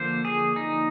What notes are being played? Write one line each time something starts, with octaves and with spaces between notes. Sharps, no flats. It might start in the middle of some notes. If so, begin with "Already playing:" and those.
Already playing: D3 F3 A#3 C5
G#4
D#4